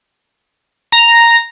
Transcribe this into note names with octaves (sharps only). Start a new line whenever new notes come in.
A#5